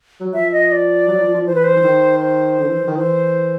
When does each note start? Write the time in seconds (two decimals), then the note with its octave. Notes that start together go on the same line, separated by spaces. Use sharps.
0.20 F#3
0.34 F3 E5
0.52 D#5
0.72 D5
1.08 F#3
1.21 F3
1.34 F3
1.46 E3 C5
1.55 B4
1.64 C5
1.76 E3
1.84 D#3
2.22 C5
2.59 D3
2.68 E3
2.78 E3
2.87 D#3
2.97 E3 C5